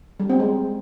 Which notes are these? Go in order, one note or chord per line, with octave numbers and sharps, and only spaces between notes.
G3
C4
G#3